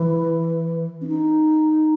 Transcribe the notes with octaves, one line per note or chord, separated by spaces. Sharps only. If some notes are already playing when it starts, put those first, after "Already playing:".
Already playing: E3
C#4
D#4